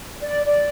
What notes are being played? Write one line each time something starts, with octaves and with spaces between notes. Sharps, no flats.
D5
D5